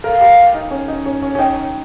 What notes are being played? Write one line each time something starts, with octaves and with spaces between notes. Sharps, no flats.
A#4 F5
G4
D#4
C#4
D#4
C#4
C#4
C#4
D#4 G5